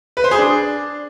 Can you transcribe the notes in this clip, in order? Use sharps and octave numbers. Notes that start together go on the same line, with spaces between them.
B4
C5
G#4
D4